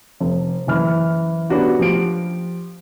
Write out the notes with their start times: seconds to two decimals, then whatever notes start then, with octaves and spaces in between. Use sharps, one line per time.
0.20 F1
0.67 F#1 E3 F6
1.50 B3 C#4 D4 F#4 G4
1.79 F3 G4 D7